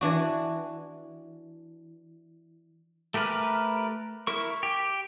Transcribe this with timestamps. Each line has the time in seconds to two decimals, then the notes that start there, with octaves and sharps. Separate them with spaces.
0.01 E3 D4 F#4
3.14 A3 G4 A#4 B4 F6
4.27 E4 A#4 C#6
4.63 G4